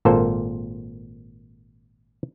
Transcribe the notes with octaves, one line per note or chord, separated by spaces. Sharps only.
G#1 A#2 A#3 A4 C5